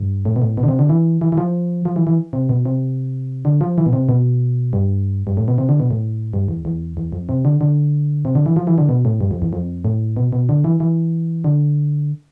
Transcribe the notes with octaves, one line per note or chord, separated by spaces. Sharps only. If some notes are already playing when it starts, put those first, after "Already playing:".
Already playing: G2
A2
B2
A2
B2
D3
C3
D3
E3
E3
E3
F3
F3
E3
E3
C3
B2
C3
D3
F3
E3
B2
C3
B2
G2
G2
A2
B2
C3
D3
B2
A2
G2
E2
E2
E2
F2
C3
D3
D3
C3
D3
E3
F3
E3
D3
B2
A2
G2
F2
E2
F2
A2
B2
B2
D3
E3
E3
D3